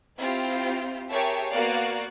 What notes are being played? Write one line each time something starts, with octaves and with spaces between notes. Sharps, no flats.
C4 E4 F4 G4
G4 G#4 A#4 C#5 E5 A5
A#3 B3 F#4 D5 F5